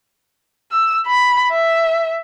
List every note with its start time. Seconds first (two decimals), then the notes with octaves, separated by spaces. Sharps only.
0.72 E6
1.06 B5
1.52 E5